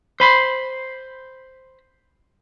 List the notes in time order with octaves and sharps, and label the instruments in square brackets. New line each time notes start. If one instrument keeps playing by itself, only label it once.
[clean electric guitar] C5 B5 C6